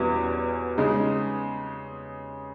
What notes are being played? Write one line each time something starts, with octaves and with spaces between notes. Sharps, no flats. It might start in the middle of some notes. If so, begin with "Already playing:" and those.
Already playing: E2 B2 G3 C#4 E4
C#3 G#3 D#4